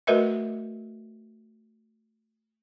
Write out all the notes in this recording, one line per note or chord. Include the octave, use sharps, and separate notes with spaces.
A3 F#4 A#4 B4 D#5 E5